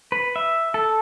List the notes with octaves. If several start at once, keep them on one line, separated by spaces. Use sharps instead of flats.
B4
E5
A4